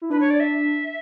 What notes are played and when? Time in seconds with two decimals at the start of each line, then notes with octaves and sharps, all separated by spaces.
0.02 E4
0.10 D4 B4
0.20 C#5
0.30 D5
0.40 E5